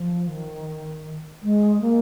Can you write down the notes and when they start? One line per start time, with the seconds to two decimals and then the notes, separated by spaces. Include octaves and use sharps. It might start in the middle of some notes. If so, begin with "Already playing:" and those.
Already playing: F3
0.28 D#3
1.42 G#3
1.81 A#3